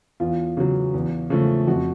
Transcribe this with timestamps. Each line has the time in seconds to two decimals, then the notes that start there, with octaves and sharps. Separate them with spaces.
0.20 E2 F4
0.57 C#3 F#3
0.94 E2
1.30 C#3 F3 A3
1.67 F2 F#4